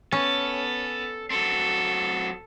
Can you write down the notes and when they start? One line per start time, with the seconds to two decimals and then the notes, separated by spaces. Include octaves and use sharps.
0.12 B3 C#4 A4
1.30 F#3 C4 A4